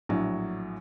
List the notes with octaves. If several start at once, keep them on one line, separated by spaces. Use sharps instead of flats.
A#1 A2 F#3